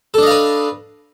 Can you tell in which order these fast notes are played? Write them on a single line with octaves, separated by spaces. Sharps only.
A4 D4 D#5 F5 B4